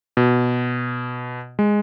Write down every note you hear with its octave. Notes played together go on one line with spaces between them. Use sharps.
B2
G#3